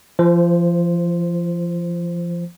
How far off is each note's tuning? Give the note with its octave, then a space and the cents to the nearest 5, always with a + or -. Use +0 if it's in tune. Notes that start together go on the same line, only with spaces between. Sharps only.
F3 -30 C5 +0